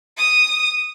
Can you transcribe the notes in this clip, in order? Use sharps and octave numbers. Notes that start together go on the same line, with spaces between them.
D#6